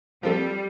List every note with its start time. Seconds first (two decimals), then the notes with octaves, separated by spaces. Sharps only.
0.23 F3 G3 C4 F4 A4